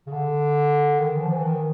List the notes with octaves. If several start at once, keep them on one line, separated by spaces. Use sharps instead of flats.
C#3
D3
D#3
E3
F3
E3
D#3